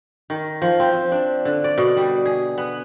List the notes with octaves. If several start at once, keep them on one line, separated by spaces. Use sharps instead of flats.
D#3
F3
C4
F3
D4
D3
D5
B2
G3
G#4
B3